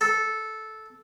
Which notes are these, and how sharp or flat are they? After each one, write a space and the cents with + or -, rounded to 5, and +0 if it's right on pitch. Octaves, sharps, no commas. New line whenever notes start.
A4 -10